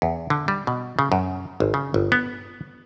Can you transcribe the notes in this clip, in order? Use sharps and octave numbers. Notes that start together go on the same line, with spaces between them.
E2
D3
G3
B2
C#3
F#2
G#1
C#3
G1
B3